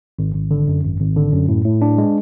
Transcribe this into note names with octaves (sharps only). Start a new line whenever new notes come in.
G#1
G#1
D3
F#2
G#1
G#1
D3
F#2
A2
A2
D4
G#3